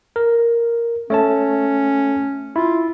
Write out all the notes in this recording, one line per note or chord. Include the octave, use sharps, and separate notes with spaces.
A#4
A3 C#4 C#5 A5
E4 F4